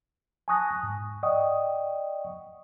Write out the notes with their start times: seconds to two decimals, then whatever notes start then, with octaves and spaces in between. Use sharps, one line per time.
0.48 G#5 A5 C#6 D#6 F#6 A#6
0.83 G#2
1.23 D5 D#5 F#5 G5 C#6 D#6